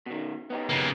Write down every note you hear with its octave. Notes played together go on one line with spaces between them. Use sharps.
B2 D#3
B3 D#4 G4
C#3 A#3